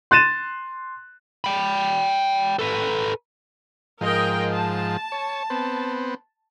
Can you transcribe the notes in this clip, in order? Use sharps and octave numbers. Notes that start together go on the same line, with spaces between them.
C6 F#6 A6 D#7 E7
G5 B5
A4 B4
G#2 F3 A#4 D#5 G5
A5
C#5
B3 C4